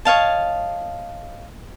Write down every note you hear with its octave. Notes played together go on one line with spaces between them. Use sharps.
C#5 D#5 F5 A5